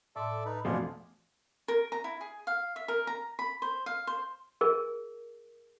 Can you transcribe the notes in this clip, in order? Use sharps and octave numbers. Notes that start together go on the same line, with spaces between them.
A2 A4 D5 E5 C6
D#4 B4
F2 B2 E3 A3 D4 F4 G#4
A#4
A#5
E4
G#4
F5
E5
A#4
A#5
B5
C5
F5
C5
G#4 A#4